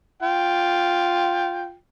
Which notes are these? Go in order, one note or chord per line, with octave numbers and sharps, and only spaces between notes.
F4 G5